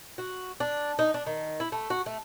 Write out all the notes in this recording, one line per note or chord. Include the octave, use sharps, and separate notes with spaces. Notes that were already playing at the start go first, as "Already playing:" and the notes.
F#4
D4
D#4
D4
D#3
E4
A3
F#4
A3